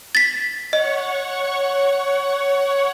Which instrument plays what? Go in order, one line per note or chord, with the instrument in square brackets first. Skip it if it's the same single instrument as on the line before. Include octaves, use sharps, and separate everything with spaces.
[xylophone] A6 B6
[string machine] C#5 F#5 C#6 [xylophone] D#5